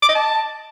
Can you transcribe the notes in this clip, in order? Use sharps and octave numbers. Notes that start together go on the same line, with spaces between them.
D6
D#5
A5